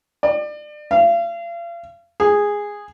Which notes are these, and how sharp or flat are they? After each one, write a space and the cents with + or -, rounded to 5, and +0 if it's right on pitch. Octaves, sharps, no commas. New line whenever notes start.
D5 +30
F5 -40
G#4 -10